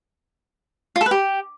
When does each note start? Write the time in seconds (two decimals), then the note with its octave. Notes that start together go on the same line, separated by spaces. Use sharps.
0.96 F4
1.01 A4
1.06 B4
1.11 G4